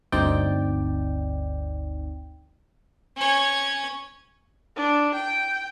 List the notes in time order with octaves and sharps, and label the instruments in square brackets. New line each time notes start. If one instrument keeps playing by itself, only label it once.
[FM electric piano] G1 D2 C4 D#4 D5 G5
[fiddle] C#4 C#5
[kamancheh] D4
G5